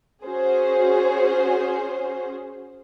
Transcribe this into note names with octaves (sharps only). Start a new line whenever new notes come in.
C#4 F#4 G#4 C5